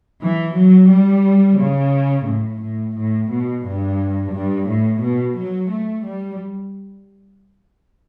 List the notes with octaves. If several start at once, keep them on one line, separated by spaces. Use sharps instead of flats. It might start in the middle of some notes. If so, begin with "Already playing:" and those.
E3
F#3
G3
C#3
A2
A2
A2
B2
G2
G2
A2
B2
F#3
A3
G3